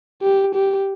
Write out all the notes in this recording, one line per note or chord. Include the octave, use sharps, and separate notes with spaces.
G4
G4